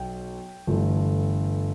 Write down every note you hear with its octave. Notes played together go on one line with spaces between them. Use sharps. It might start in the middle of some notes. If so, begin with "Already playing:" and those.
Already playing: B1 G5
G1 G2 E3 A3